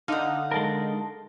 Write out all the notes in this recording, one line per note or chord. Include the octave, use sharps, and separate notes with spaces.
D3 D#4 F5 F#5
G#3 A4 A#4